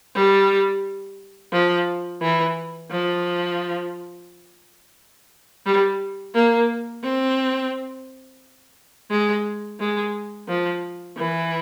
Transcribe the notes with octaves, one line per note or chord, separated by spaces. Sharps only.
G3
F3
E3
F3
G3
A#3
C4
G#3
G#3
F3
E3